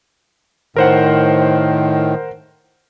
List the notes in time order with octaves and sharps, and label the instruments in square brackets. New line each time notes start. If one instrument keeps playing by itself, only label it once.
[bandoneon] A2 D#3 [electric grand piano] A#4 C5 F#5